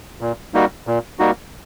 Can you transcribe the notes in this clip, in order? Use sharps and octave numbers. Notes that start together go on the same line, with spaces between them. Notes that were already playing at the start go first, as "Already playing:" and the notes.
A#2
G3 A#3 D#4 F#4
A#2
G3 A#3 D#4 F#4